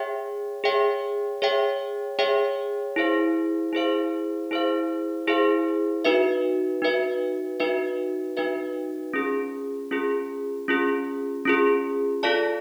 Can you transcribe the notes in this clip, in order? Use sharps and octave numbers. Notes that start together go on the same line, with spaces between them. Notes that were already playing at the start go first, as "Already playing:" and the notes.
Already playing: G#4 C#5 E5 G5
G#4 C#5 E5 G5
G#4 C#5 E5 G5
G#4 C#5 E5 G5
E4 G#4 C5 F5
E4 G#4 C5 F5
E4 G#4 C5 F5
E4 G#4 C5 F5
D#4 F#4 B4 E5
D#4 F#4 B4 E5
D#4 F#4 B4 E5
D#4 F#4 B4 E5
C#4 F4 G#4
C#4 F4 G#4
C#4 F4 G#4
C#4 F4 G#4
F4 A4 D5 F5 A5